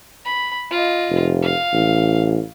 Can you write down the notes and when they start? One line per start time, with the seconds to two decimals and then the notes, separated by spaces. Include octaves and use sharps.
0.25 B5
0.71 F4 D#5
1.10 F1
1.42 F5
1.73 A1